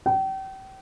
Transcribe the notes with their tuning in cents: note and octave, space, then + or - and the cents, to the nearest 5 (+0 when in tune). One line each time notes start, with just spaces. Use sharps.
G5 -35